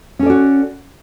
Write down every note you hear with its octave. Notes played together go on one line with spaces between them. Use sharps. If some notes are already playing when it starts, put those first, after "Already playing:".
C#4 F#4 A4 D5